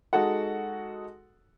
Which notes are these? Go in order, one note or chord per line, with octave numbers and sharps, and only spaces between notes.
G#3 D#4 F#4 A4 F#5